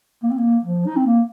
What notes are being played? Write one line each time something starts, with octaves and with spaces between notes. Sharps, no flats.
A#3
C4
A#3
F3
D#4
C4
A#3